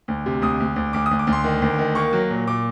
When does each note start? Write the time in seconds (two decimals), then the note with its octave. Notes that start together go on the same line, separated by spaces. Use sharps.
0.08 D2
0.26 C3
0.42 D2 D#6
0.60 D2
0.76 D2
0.93 D2 D6
1.06 D#6
1.11 D2
1.19 D6
1.27 D2
1.32 C6
1.44 D#3
1.62 D2
1.79 D#3
1.95 A#3 C#6
2.13 F#3
2.30 A#2
2.47 A#2 D6